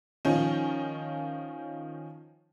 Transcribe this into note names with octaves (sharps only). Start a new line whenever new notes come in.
D#3 F3 C#4 D#4